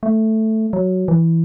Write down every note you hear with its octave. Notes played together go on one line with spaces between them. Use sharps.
A3
F#3
E3